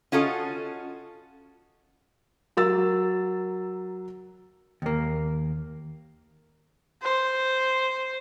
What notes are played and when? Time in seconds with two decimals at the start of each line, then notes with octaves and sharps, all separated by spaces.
0.12 C#4 F4 F#4 A4 D#5
2.57 F#3 A#4 E6 A6
4.82 D#2 A#3
7.03 C5